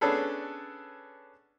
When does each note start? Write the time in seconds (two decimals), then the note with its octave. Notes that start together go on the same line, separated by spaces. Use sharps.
0.01 B3 C#4 D4 G#4 A4 B4